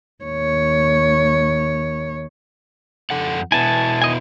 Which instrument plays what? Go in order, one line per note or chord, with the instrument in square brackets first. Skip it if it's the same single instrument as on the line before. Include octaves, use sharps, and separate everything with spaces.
[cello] D#2 C#5
[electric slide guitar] F2 A4 F#5
[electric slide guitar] B2 B3 E4 [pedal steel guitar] G#5 A5
[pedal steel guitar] D#3 D#5 G#5